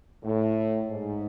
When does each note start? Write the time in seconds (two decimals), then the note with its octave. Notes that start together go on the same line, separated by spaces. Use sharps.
0.24 A2
0.90 G#2